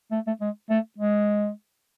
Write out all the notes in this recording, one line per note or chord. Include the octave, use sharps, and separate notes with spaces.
A3
A3
G#3
A3
G#3